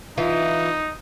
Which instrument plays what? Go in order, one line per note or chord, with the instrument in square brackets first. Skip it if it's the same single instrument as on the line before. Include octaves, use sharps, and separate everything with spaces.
[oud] E3 F4 [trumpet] D#4